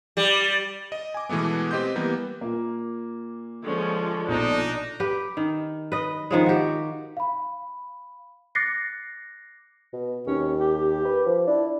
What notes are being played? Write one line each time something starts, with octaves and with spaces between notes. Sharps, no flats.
G3
D#5
G#5 D6
B2 E3 G#3 A3 B3
C4 G4 D#5 C6 G6
E3 G3 A#3 B3
A#2 A#3
D3 F3 G#3 C#4
A#1 B2 D4 D#4
G4 B4
D#3
B4 D#5
D#3 F3 G#3
F#4 G4
F5 B5
D6 F#6 A6 A#6 C7 C#7
B2
D#2 C#4
G4
B4
F3
D4 E4